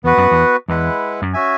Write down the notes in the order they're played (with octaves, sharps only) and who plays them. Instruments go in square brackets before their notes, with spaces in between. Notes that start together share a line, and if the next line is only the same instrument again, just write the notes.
[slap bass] E2 [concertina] B3 F#4 B4 F#5
[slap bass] F#2
E2
[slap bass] E2 [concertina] G#3 E4 B4 F#5
[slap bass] F#2
[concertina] C#4 F#4 E5 G#5